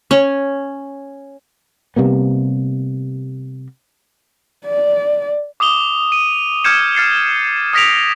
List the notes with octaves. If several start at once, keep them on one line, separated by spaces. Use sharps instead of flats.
C#4
C3 G3 A#3 B3
D5
D6 D#6 F7 G7
D#7
D6 F6 G6 G#6 C#7 E7
F6 A6 C7 C#7
D#6 F6 A#6 B6 D7 F7